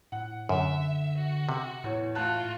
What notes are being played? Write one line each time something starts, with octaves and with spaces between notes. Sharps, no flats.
A2 F#5
F#2 D3 E5
F#4
C3
E2 A2 C#5
A3 F4 F#4 A5 F#6